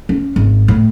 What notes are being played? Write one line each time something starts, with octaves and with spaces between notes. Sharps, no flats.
C#4
G#1
A2